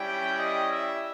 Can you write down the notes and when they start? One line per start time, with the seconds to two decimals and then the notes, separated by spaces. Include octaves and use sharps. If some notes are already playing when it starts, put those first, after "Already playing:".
Already playing: G3 C#4 E4 G4 G5
0.38 D#5
0.72 E5